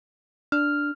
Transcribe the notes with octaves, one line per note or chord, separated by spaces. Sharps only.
D4 F6